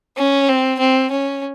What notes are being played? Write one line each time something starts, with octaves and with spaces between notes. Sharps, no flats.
C#4
C4
C4
C#4